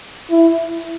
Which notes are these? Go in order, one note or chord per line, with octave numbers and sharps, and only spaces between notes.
E4